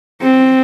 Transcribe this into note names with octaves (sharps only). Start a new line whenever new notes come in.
C4